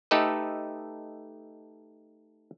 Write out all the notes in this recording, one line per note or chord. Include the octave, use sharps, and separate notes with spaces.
A3 D#4 G4 A4 B4 D#5